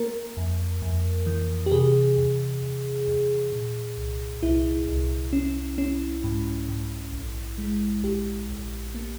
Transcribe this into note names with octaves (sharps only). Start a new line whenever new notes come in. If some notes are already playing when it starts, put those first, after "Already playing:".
Already playing: A#3 A#4
F2
F2
E3
G4
C3 G#4
E2
E2
E2
A#2
C2
C2 E4
C2
C#4
C#4
G#2
G#2
A#1
G#3
A#1 G4
A#1
A#3